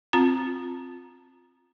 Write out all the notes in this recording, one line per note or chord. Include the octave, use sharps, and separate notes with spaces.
C4 F4 A#5